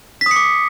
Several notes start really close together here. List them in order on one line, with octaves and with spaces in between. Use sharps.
B6 D#6 C#7 D6